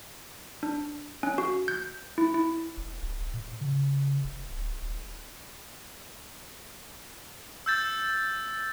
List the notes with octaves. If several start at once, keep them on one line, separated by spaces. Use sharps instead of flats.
D4
C#4
F#4
G6
E4
E4
E1
D1
D#1
A2
C#3
E1
D1
D#1
E6 G6 A6